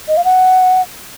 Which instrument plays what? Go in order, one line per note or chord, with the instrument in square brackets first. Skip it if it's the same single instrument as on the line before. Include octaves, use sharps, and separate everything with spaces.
[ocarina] D#5
F5
F#5